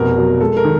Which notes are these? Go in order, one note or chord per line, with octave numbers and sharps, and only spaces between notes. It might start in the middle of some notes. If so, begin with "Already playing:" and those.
Already playing: F1 B2 A#4
F#3
G#3 A4
A#4
D#3